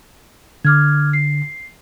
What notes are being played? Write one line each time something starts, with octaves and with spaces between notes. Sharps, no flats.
D3 D6 F6 G#6
C7